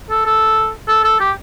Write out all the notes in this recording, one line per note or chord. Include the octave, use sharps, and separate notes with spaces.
A4
A4
A4
A4
G4